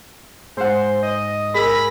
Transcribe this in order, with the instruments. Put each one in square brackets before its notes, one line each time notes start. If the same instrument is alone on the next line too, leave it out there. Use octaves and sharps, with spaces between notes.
[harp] G#2 F#5 [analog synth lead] C5
[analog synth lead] D#5
[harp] G#4 E6 [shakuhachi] A#4 [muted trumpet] B5 [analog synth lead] A#6